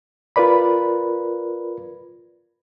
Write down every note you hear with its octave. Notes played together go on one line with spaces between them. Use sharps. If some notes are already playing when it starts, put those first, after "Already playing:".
F4 A#4 B4 D5 B5